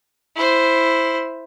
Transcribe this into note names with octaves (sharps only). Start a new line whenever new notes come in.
E4 C5